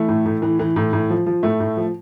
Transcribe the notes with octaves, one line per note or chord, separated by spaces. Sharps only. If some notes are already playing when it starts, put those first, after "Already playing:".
Already playing: E3 A3
A2
A2
E3
E3
A2
A2
F3
F3
A2 A3
A2
F3